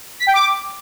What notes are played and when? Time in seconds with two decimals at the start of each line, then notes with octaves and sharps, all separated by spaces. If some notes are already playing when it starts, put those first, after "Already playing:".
0.20 B6
0.27 G5
0.34 D6